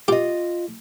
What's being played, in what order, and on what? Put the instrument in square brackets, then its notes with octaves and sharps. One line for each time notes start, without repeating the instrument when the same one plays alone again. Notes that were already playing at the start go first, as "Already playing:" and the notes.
[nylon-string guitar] F4 D#5 [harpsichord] G4